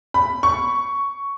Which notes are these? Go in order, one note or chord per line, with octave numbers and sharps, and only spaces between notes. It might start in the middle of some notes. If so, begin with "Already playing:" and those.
B5
C#6